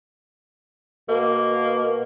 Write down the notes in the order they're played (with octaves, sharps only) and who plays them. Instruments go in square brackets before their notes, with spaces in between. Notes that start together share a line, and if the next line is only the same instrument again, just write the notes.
[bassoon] B2 [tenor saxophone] A#3